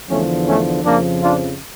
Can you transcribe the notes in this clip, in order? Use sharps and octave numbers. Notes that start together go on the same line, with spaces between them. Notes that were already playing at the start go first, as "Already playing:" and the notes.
E2 D3 F3 A3 C#4
A3 C#4
F2 C#3 F3 A#3 D4
D4 F4